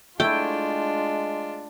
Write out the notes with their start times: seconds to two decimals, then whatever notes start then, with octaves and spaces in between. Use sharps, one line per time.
0.20 G#3 A3 D4 E4 F4 G5